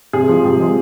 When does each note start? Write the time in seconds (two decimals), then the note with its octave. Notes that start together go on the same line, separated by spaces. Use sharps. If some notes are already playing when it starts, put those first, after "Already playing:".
0.13 C3 G#4
0.29 F3 G#3
0.45 C3
0.60 F3 G#3